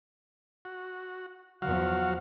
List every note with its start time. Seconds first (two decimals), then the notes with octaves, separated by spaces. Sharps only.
0.65 F#4
1.62 E2 F3 F#3 F#4 F5 F#5